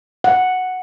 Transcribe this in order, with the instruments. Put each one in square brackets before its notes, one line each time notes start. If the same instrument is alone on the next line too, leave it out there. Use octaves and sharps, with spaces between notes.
[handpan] F#5